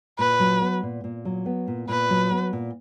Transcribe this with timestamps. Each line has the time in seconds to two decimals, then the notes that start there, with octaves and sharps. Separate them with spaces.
0.19 A#2 B4
0.40 F#3
0.61 B3
0.83 A#2
1.04 A#2
1.25 F#3
1.46 B3
1.68 A#2
1.89 A#2 B4
2.10 F#3
2.31 B3
2.53 A#2